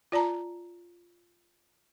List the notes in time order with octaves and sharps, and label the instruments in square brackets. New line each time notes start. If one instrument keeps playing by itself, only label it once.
[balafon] F4 D5 A5 A#5